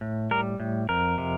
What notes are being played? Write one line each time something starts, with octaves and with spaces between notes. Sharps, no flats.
A2
G3 A#4
A2
F2 A#4
C3